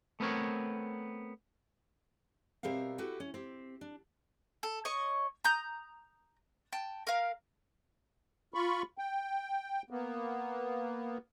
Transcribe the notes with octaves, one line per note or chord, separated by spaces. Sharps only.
A3 B3 C4 A#4 C#5
B2 G3 C4 A#4 E5 F5
E4 F#4 G4 A4 B4
C#4
C4 G4
D4
A4
C#5 D#5 C#6
A#5 D#6 G6
G5 A5
A#4 F5
F4 B5 C#6
G5
A#3 B3